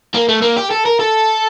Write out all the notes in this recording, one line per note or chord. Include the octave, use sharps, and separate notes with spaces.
A#3
A3
A#3
G4
A4
A#4
A4